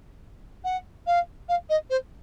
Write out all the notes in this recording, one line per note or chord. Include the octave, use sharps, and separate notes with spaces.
F#5
F5
F5
D#5
C5